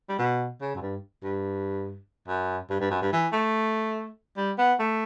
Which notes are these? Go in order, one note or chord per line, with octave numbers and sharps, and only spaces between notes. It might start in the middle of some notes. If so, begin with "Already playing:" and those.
G3
B2
C#3
F#2
G2
G2
F#2
G2
G2
F#2
G2
E3
A3
G3
B3
A3